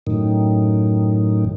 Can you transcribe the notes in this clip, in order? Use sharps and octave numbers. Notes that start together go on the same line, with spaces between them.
F#2 A2 D#3